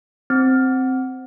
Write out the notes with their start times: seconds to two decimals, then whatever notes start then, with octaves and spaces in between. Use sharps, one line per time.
0.30 C4